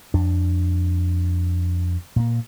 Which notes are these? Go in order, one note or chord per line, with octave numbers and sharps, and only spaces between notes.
F2 D4
A#2 A#3